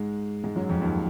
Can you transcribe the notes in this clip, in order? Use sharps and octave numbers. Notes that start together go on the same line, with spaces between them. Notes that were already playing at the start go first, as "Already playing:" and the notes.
Already playing: G#2 G#3
G#2 G#3
F#2 F#3
F2 F3
D#2 D#3